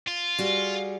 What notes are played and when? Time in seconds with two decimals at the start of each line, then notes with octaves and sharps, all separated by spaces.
0.08 F4
0.39 G3 F#4 G#4